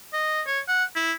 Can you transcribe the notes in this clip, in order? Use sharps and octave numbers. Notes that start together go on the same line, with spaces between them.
D#5
C#5
F#5
E4